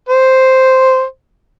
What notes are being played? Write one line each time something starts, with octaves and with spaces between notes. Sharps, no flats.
C5